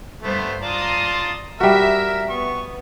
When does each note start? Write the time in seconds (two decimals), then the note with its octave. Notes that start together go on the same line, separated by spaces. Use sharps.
0.23 G2 A3 B3 C5
0.63 F4 D5 A5 A#5 C6 D#6
1.60 G3 F#4 A#4 E5
2.29 B3 C#6